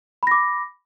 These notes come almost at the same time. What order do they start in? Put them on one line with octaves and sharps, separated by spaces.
B5 A#6 D6